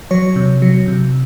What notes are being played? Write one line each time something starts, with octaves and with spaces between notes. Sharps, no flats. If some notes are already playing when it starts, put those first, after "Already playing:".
F#3 C#5
C3
F#3
C3